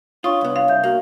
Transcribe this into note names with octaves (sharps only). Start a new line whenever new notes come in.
D4 F4 C#5 C#6 D#6
C2 B3
F5
C2 E5 G6
A#3 F#4